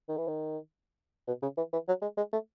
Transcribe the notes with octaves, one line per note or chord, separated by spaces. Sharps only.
D#3
E3
D#3
B2
C#3
E3
E3
F#3
G#3
G#3
A3